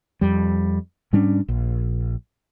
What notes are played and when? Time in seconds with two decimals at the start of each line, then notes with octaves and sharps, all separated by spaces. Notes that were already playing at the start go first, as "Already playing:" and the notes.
0.21 F2 G3
1.13 G#2 G3 C#4 D4
1.48 A#1